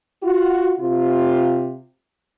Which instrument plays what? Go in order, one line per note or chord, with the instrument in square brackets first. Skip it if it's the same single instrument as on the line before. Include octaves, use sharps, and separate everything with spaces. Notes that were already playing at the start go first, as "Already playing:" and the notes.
[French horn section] F4 F#4
C3 F4